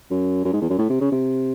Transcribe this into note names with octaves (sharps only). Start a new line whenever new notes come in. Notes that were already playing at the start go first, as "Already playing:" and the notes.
F#2
F#2
G#2
E2
F#2
A2
C3
C#3
C3